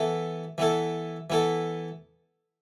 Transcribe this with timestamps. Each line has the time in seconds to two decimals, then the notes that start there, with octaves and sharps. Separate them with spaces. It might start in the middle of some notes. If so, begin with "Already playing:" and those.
Already playing: E3 B3 E4 A4
0.58 E3 B3 E4 A4
1.30 E3 B3 E4 A4